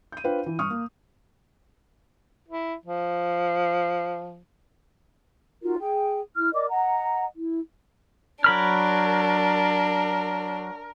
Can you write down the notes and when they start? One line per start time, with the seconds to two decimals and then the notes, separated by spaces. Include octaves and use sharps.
0.12 G6 D#7
0.24 D4 F4 B4 C5 F5 G5
0.46 E3
0.59 G2 C#6 D#6 F6
0.70 A#3
2.48 E4
2.86 F3
5.62 D#4 F4 F#4 A#4
5.79 G#4 G5
6.35 E4 F6
6.53 A#4 D5 D#5 D6
6.69 D#5 F#5 A#5
7.36 E4
8.44 F#3 D4 A#4 B5 F6